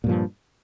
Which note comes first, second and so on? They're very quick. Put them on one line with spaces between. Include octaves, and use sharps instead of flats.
A#2 G2 F3